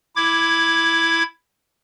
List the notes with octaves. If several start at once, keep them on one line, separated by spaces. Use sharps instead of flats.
E4 D6 G#6